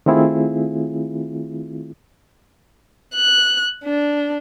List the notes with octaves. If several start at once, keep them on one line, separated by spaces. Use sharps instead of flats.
D#3 A3 C4 E4 F4 G#4
F#6
D4